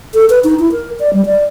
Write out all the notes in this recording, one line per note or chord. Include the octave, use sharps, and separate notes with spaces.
A4
B4
D#4
E4
A#4
D5
G3
D5